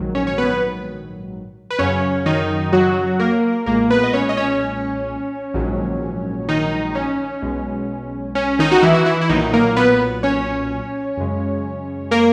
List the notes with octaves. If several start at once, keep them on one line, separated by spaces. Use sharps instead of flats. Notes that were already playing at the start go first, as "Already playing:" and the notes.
Already playing: A#1 G#2 D#3 F#3
C#4 C#5
C#5
B3 B4
B4
F#2 C#3 F#3 C#4 C#5
D#3 D#4
F#3 F#4
A#3 A#4
B1 A#2 G#3 A#3 A#4
B3 B4
D#5
C#4 C#5
D#5
C#4 C#5
A#1 G#2 D#3 F#3
D#3 D#4
C#4
B1 B2 G#3
C#4
D#3 D#4
F#4
E3 E4
F#4
E3 E4
E4
B1 A#2 D#3 F#3 D#4
A#3 A#4
B3 B4
C#4 C#5
F#2 C#3 G#3
A#3 A#4